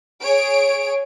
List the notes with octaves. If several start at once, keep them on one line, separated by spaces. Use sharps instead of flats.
G#4 C#5 D7